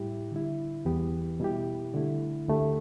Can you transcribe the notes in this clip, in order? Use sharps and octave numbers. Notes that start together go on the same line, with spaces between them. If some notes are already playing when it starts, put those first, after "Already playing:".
Already playing: A2 G3 E4 G4
D3 G3 E4
E2 E3 B3 G4
B2 G3 E4 G4
D3 A3 E4
D2 D3 A3 G4